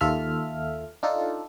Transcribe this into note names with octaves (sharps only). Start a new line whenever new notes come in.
D#2 F4 A4 E5 F6
D4 D#4 F4 A4